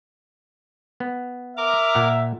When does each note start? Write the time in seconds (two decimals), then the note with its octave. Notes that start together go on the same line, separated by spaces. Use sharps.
1.00 B3
1.57 A#4 E5 A#5 D6
1.95 A#2 F#5